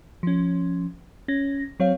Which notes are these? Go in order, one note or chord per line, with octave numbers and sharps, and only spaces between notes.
F3 C#4
C#4 A#6
F#3 C4 C#5 F5